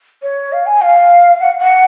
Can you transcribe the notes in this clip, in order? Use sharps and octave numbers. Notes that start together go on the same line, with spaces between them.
C#5
F5
G#5
F5
F#5
F#5